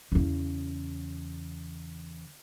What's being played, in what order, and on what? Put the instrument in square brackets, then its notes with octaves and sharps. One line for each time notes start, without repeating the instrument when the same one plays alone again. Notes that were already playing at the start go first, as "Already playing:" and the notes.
[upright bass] E2 C#3